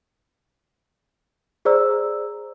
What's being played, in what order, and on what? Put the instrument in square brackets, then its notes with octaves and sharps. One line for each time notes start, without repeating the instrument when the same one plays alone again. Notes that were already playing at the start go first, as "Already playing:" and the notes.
[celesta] G#4 C5 D5 A#5 E6